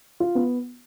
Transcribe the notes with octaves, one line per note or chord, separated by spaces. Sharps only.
F4
B3